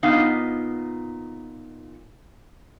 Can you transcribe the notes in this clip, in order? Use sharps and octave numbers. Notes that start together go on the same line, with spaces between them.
A#2 B3 D#4 F5